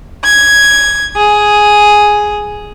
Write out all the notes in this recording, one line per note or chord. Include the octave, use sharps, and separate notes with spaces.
G#6
G#4